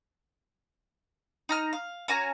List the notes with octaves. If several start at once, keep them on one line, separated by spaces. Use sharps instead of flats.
D#4 A#5 F6
F5
C#4 F#4 G#5 A#5